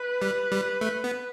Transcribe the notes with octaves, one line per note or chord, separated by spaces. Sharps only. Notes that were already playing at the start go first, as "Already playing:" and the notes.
Already playing: B4
G3
G3
A3
B3